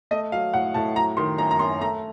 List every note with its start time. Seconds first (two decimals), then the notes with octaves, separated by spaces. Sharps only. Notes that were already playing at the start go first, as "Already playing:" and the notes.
0.11 A3 D#5
0.32 F#3 F5
0.54 A2 F#5
0.74 A2 A5
0.96 F#3 A#5
1.17 D#3 C6
1.38 F#2 A#5
1.51 A#5
1.59 F#2 C6
1.81 A3 A#5